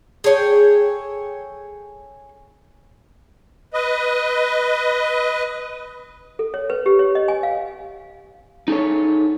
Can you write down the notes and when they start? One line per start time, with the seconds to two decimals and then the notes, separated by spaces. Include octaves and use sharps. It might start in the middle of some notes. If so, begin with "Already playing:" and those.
0.24 G#4 A4 C#5 G5
3.74 B4 D#5
6.39 A4
6.54 C#5
6.70 B4
6.86 G4
6.99 C#5
7.15 D#5
7.28 G#5
7.43 F5
8.68 D#4 G#4 A4 C#5